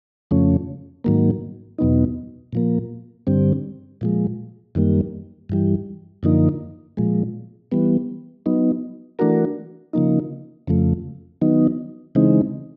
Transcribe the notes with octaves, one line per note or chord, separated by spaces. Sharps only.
F2 C#3 F3 A3 C#4
G#2 D#3 F#3 A#3
E2 B2 F#3 B3 D#4
A#2 F3 A#3
G2 D3 G3 C4
A#2 F3 G#3
F#2 D#3 G3 A#3
G2 E3 G3
F#2 D3 F3 A#3 D#4
A#2 F3 G#3
E3 G3 B3
F#3 B3 D#4
E3 A3 D4 F#4 A#4
C#3 F3 A#3 D#4
F2 C#3 F3 A3
D#3 F#3 B3 D#4
C#3 E3 G#3 C4 D#4